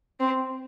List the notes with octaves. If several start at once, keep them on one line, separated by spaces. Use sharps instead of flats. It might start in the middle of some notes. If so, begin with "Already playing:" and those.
C4